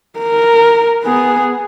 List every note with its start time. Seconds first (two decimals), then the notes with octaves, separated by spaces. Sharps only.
0.19 A#4
1.03 B3 G#4